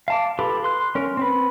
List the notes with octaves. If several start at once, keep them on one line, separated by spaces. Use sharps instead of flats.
F5 A5 D6
F4 G4 A4 B4 D6
C6 F#6
C#4 A#4
C4 B4